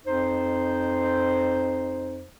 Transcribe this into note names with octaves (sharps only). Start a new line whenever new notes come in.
F2 D#4 C5